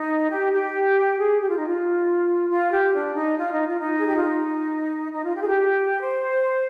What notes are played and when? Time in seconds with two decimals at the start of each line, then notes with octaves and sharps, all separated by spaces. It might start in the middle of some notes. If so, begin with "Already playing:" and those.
Already playing: D#4
0.30 G4
0.53 G4
1.18 G#4
1.40 G4
1.49 F4
1.58 D#4
1.67 F4
2.50 F4
2.71 G4
2.94 D4
3.15 D#4
3.37 F4
3.52 D#4
3.67 F4
3.81 D#4
3.97 G#4
4.07 G4
4.15 F4
4.25 D#4
5.12 D#4
5.24 F4
5.34 G4
5.41 G#4
5.46 G4
6.00 C5